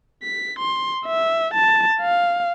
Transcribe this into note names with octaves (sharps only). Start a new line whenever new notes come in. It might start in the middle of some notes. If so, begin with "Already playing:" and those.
B6
C6
E5
A5
F5